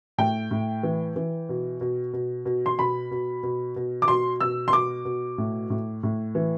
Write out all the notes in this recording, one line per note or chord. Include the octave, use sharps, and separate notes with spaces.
A2 G5
A2
E3
E3
B2
B2
B2
B2
C6
B2 B5
B2
B2
B2
D6
B2 C6
B2 E6
C6
B2 D6
B2
A2
A2
A2
E3